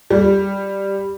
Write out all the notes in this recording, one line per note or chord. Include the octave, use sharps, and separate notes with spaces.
G3